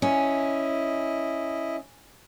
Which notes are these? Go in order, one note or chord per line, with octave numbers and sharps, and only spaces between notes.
C#4 E4 D#5